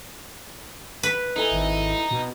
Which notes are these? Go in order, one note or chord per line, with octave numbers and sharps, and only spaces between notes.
B4
D#4 E4 A4 G#5
G#1
B2